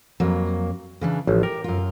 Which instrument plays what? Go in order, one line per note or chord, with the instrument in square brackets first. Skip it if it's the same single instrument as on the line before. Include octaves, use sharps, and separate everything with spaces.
[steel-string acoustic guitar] F2 F#3 A#3
C#3 E3 D4
[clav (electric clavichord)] A1 [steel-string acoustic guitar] F3
[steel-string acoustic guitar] G4 [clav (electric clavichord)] A#4
[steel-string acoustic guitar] F#2 F4